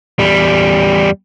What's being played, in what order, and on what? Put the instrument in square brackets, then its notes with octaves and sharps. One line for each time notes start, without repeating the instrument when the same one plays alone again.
[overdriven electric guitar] E2 G3